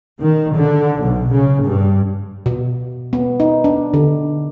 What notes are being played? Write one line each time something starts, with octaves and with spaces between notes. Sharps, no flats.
D#3
D3
B1
C#3
G2
B2
B3
D#4
D4
D3